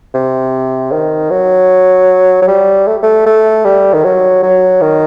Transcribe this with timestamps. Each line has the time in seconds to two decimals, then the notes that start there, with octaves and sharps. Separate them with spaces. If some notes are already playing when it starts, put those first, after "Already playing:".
0.14 C3
0.92 D#3
1.30 F#3
2.42 F#3
2.47 G3
2.87 A3
3.03 A3
3.26 A3
3.65 G3
3.94 D#3
4.04 F#3
4.43 F#3
4.81 D#3